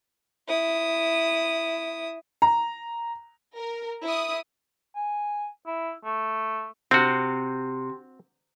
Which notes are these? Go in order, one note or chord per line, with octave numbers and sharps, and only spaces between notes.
E4 D#6
A#5
A#4
E4 D#6
G#5
E4
A3
C3 C4 F#4